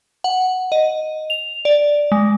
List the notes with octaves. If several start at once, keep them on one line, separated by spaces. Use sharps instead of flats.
F#5
D#5
F7
D5
G#3